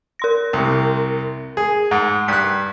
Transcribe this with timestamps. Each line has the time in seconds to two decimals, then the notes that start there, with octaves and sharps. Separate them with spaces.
0.19 A#4 C6 A#6
0.53 C2 C3
1.57 G#4
1.91 G#2 F#5
2.28 G2 F#6 G6 B6